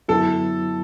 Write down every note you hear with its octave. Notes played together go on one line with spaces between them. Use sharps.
F#2 D3 F#3 B3 E4 A4